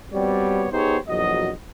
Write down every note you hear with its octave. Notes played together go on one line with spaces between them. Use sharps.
G3 B3 C4 F#4 C#5 D5
B3 D#4 G4 G#4 C5 C#5
A#1 E2 F#3 F#4 D#5